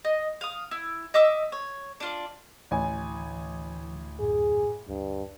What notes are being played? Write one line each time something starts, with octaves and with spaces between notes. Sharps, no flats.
D#5
F5 D#6
E4
D#5 E5 D6 E6
C#5
D4 F4 D5
A1 D2 E3 G#5
F#2 A2 G#4
D2 G2